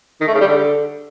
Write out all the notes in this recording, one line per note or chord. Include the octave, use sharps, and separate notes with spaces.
D#3
A3
C#3
G3
D3